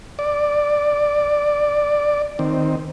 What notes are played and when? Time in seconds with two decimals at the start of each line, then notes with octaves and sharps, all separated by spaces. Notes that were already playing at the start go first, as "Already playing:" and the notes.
0.19 D5
2.39 D#3 C4